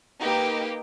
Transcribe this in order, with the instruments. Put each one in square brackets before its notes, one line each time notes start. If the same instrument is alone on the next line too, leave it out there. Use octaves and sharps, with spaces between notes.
[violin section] A#3 D#4 G4 B4